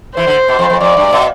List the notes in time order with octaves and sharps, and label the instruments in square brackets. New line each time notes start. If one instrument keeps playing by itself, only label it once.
[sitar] E3 [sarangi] C5
[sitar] D3
B2
F2
F2
[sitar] F2 [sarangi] D5
[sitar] G2
B2